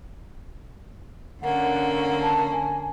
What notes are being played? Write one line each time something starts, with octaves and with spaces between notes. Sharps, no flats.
D3 A#3 C#4 F#5
A5
G#5